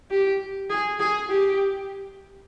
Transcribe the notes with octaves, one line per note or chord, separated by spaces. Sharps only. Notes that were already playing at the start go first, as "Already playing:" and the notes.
G4
G#4
G#4
G4